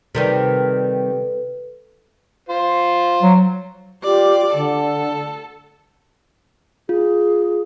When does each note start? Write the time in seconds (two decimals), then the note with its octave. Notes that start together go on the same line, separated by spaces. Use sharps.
0.15 C3 D#3 G3 A4 B4
2.49 F4 C5
3.22 F#3
4.04 F4 G4 D5
4.54 D3 A4
6.89 F4 G#4